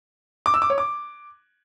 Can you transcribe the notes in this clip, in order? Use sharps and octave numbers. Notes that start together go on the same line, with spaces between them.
D6
E6
D6
C#5
D6